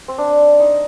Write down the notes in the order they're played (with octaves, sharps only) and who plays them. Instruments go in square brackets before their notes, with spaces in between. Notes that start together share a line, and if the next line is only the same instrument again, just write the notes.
[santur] C4
D4
D#4